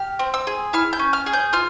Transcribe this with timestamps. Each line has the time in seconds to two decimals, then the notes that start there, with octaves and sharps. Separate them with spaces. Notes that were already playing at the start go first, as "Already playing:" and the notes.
Already playing: G4 F6
0.19 C4
0.34 E6
0.47 G#4
0.73 E4 F6
0.93 G6
0.99 C#4
1.13 F6
1.26 G#4
1.33 G6
1.53 F4 F6